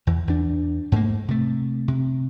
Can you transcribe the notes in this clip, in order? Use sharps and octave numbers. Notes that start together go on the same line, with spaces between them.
E2 E3
E2 D4
G#2 A3 A#3
C3 A3
C3